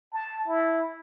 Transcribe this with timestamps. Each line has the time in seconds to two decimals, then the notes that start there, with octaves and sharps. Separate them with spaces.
0.13 A5
0.48 E4